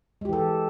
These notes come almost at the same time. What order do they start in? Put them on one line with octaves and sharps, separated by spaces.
G#3 G4 E3 A4